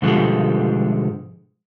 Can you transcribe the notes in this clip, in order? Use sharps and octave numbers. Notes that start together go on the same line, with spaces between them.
G#2 B2 D3 F3 G3 G#3